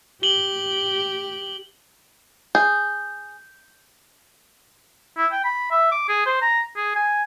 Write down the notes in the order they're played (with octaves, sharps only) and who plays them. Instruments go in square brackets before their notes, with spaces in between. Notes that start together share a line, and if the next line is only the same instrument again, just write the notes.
[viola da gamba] G4 [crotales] F#7 G7
[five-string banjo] G#4 [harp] G6
[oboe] E4
G5
B5
E5
D6
G#4
C5
A#5
G#4
G#5